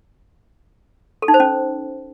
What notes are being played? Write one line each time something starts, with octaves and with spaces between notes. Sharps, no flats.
A4
D#4
C5
C#4